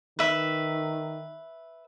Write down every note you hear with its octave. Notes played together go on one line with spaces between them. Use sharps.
D#3 B4 E5